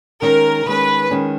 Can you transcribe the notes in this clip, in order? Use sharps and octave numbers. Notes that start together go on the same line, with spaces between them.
D#3 G#3 C#4 A#4
D#3 G#3 C#4 B4
D#3 G#3 C#4